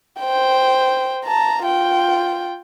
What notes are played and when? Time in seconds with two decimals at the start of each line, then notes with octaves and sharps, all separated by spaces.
0.20 C5 G5
1.25 A5 A#5
1.64 F4 G5